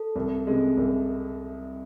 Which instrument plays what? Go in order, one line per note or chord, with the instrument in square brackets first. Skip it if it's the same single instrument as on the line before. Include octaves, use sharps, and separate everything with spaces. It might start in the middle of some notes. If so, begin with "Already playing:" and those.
Already playing: [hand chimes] A4
[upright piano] C2
C3 G#3
C2